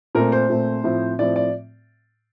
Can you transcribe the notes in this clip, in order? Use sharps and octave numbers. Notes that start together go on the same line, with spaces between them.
A#2 A3 C4 A#4
C5
A#2 A3 C4
A2 F3 C4
A2 F3 C4 D5
D5